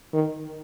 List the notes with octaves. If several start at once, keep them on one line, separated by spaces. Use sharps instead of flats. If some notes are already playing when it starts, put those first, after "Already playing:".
D#3